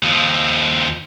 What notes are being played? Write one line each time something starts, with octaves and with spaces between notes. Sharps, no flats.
D#2 F3